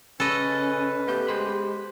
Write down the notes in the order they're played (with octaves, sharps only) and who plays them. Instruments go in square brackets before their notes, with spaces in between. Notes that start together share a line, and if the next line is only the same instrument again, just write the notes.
[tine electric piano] C#3 [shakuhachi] C#4 [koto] A4 D#5 [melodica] B4
[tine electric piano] A3 B3 G6 [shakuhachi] G4
[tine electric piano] G#3 C5 B5